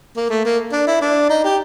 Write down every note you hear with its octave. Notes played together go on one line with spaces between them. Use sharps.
A#3
A3
A#3
D4
E4
D4
D#4
G4